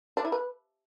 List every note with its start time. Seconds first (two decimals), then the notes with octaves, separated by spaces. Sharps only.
0.17 D4
0.25 E4
0.32 B4